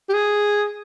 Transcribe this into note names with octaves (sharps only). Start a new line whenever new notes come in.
G4
G#4